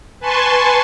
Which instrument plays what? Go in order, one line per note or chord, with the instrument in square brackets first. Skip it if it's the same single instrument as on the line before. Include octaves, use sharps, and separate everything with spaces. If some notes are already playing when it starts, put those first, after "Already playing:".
[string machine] B4 G#5 A5 C6 C#6